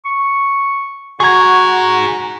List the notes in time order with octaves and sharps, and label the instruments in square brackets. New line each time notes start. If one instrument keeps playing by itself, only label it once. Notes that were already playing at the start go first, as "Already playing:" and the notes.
[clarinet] C#6
[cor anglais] F#4 [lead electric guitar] G#4 A#5 [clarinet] F#5 [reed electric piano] C#6 G#6